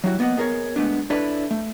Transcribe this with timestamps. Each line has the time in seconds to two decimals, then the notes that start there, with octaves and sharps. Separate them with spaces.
0.04 F#3 G3 E4 F#4
0.19 A#3 B3 D#5 F#5
0.37 B3 G#4 A#4 C5 C#5
0.76 G#3 A3 B3 D4
1.10 D4 E4 A4 B4 C#5 D5
1.51 A3